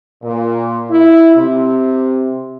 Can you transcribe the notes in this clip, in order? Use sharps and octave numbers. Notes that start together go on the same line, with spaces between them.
A#2
E4
C3